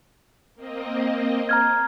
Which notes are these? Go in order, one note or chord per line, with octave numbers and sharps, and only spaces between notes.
A#3 C4 D#5
A#5 F6 G#6